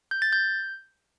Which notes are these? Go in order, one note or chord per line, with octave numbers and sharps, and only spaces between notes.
G6
A6
G6